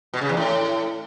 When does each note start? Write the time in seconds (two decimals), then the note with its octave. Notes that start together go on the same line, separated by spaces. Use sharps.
0.14 B2
0.21 C#3
0.29 E2
0.37 A2